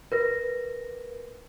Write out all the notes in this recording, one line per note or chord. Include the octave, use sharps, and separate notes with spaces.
A#4 B4 A#6